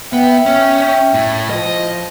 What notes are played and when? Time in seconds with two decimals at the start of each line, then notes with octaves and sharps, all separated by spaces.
0.13 B3 E5 G5
0.46 C#4
1.14 A2
1.50 F3 D#5